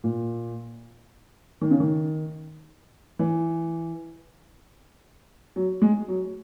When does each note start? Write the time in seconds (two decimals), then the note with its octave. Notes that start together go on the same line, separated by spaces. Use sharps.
0.04 A#2
1.61 D#3
1.71 C#3
1.80 D#3
3.19 E3
5.56 F#3
5.82 G#3
6.08 F#3